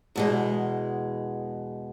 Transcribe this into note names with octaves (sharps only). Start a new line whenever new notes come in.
E2 B2 G#3